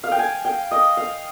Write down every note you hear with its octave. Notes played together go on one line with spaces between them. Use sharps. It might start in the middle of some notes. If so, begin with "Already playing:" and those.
F5
G5
G#5
G5
D#5
F5